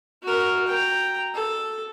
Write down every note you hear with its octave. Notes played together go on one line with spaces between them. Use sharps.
F#4 A#4
G5 A#5
A4